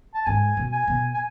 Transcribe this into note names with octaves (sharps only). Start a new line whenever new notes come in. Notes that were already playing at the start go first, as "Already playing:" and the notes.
A5
G#2 G#5
B2
G#5
B2
G#5